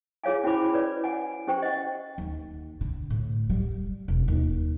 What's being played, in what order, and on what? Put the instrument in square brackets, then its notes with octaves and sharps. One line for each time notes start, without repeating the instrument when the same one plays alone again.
[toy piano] F4 G#4 C#5 F5 G#5
C#4 E4 F#4 C5 B5 D6
B4 C#5 D5
F#5 G#5
C#4 G4 C5 G5 C#6
D#5 F#5
[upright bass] D#2
D3
A2
G3
E1
D#2